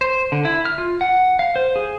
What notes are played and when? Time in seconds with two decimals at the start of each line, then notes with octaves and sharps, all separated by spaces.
0.01 C5
0.32 D3
0.45 E4
0.65 F6
0.78 F4
1.01 F#5
1.39 F5
1.56 C5
1.76 G#4